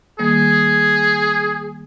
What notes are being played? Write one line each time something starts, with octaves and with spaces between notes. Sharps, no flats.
D#3 G3 A#3 G#4